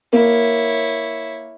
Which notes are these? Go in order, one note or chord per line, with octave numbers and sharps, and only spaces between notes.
A#3 E4 C#5